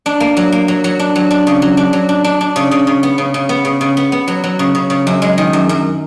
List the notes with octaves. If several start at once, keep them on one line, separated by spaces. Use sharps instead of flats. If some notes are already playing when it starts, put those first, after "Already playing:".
D4
A#3
F#3
A#3
F#3
F#3
D4
F#3
D4
C#3
F#3
D4
F#3
D4
D4
D4
C#3
C#3
C#3
B3
C#3
C#3
B3
C#3
C#3
B3
B3
F#3
F#3
C#3
C#3
C#3
F#2
G#3
D#3
F#2
F#2